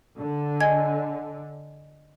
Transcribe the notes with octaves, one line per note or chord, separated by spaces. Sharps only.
D3
D#5 G#5 G#6